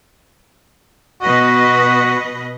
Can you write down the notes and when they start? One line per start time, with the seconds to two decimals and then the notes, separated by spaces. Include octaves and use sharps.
1.22 B2 F#4 B4 D#5